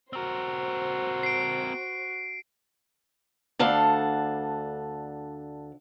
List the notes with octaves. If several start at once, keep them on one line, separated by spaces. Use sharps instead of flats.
C4 F#4 A#4 C5
C7 D7
D2 D4 A4 F5 F#5